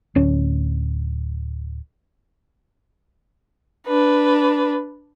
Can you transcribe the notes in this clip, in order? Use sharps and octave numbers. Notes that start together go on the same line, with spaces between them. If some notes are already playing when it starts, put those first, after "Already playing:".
D1 C#4
D4 B4